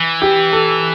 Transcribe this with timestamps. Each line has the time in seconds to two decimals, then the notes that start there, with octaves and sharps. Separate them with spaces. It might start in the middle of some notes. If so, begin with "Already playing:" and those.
Already playing: E3
0.22 G4
0.53 A4